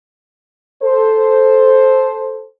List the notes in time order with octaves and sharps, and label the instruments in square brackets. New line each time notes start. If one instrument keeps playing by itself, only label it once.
[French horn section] A4 C5